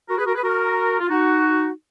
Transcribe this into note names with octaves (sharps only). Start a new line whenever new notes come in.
F#4 A#4
G#4 B4
F#4 A#4
G#4 B4
F#4 A#4
F4
D#4 F#4